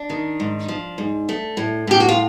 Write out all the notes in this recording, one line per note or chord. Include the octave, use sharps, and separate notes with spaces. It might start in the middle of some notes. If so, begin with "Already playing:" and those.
Already playing: D4
D#3
G#2
F3
G#2
A3
A2
A2 G4
F#4
F4